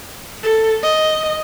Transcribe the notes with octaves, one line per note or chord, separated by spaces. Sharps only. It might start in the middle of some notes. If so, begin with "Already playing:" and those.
A4
D#5